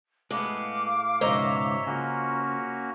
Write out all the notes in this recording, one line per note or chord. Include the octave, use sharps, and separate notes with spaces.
A2 G#3 B3 F5 D6
C#2 G#2 B2 C5 C#5 D#5 E5 A#5
C#3 A#3 C#4 F4 F#4